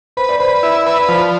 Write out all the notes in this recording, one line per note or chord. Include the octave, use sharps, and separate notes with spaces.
B4 C5
D5
B4 C5
E4
B4
D5
F3 C5